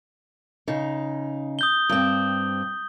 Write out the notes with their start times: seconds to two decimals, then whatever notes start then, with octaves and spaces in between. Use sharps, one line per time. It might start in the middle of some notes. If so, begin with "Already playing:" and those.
0.68 C#3 D#4
1.59 D#6 G6 G7
1.89 G2 C4